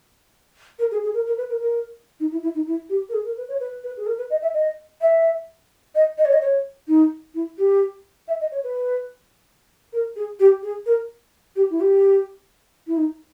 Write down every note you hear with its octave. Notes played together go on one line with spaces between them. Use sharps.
A#4
G#4
G#4
A#4
A#4
B4
A#4
A#4
D#4
E4
E4
D#4
E4
G4
A#4
G#4
A#4
B4
C#5
B4
B4
G#4
A#4
B4
D#5
E5
D#5
E5
D#5
D#5
C#5
D#5
C#5
D#4
E4
G4
E5
D#5
C#5
B4
A#4
G#4
G4
G#4
A#4
G4
E4
G4
E4
D#4